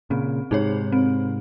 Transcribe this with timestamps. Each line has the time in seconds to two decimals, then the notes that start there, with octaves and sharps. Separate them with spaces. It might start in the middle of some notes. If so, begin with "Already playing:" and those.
0.10 A#2 C#3 C4
0.51 G#2 C3 D#4 G#4 C#5
0.92 C4